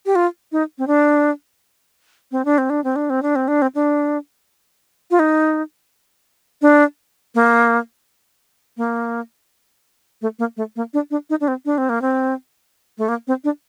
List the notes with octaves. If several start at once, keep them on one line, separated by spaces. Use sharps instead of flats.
G4
F4
D#4
C4
D4
C4
D4
C4
D4
C4
D4
C4
D4
C4
D4
C4
D4
F4
D#4
D4
A#3
A#3
A3
A#3
A3
A#3
D4
D4
D#4
D4
C4
D4
C4
A#3
C4
A3
A#3
C4
D4